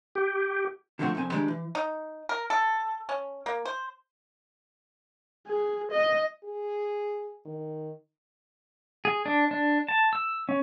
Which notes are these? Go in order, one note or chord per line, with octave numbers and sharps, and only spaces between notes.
G4
D3 F3 A3 C4 F#4
C2 F2 C4 G#5
D#3 G3 G#3 D4
E3
D#4
A#4
A4
C#4
A#3
C5
G#4
D#5
G#4
D#3
G#4
D4
D4
A5
E6
C#4